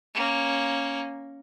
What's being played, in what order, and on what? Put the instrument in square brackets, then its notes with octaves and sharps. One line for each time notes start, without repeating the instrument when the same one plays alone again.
[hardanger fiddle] A#3 C#4